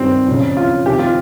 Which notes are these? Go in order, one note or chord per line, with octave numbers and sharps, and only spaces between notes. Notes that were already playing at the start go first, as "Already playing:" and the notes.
Already playing: G2 D#3 C4
F2 C#3
F4
F2 C3 D#3 G4
F4